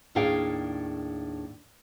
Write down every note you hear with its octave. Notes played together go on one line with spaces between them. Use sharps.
D#2 A2 D4 G#4 F5 G5